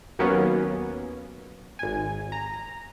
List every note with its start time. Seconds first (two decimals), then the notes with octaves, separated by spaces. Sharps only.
0.19 D#2 F#3 A#3 B3 C#4
1.79 G#1 G#5
2.32 A#5